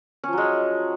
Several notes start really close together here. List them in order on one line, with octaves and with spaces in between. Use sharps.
C#4 F3 F#3 G#3